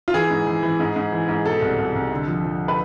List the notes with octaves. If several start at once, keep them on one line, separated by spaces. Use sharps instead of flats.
F4
E3 G#4
G#2
E3
E3
G#2
G#2
E3
G#2
B2 A4
C2
C2
C2
D3
F3
F3
B4